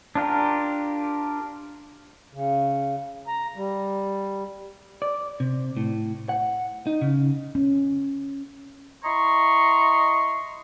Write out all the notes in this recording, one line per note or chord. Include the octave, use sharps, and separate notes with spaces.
D4 F4 G4 A#4
C#3
A#5
G3
D5
C3
A2
F#5
D#4
C#3
C#4
E4 D#5 A#5 C6 C#6